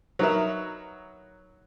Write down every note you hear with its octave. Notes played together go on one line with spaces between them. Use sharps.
F#3 D#4 A#4 B4 E5